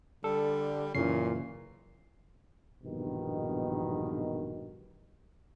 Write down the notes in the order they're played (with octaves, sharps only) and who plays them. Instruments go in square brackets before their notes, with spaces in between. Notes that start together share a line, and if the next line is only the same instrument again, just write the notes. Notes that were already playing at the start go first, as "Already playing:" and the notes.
[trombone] D3 [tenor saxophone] G3 [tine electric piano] A4
[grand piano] F#1 E3 [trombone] A#2 [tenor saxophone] C#4 [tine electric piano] C7
[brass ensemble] A#1 E2 G2 B2 D#3